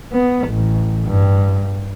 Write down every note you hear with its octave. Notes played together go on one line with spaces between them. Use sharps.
B3
A1
G2